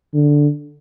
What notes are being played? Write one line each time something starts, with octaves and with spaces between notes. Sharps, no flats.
D3